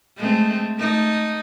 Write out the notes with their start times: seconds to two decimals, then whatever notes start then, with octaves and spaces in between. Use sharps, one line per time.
0.17 G#3 A3 C4
0.78 A3 D#4